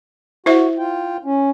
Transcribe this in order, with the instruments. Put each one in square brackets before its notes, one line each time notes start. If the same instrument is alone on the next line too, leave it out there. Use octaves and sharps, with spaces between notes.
[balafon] E4 C5 E5 [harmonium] F#4
[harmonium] F4 G5
C#4